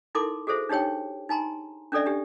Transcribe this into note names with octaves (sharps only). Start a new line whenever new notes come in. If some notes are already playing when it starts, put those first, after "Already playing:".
D#4 E4 A4 A#4 C6 D6
F#4 G#4 A4 C5 E5
D4 D#4 G4 C#5 G5
D#4 G#5 A#5 C6
C#4 D4 A4 D5 E5
D4 G4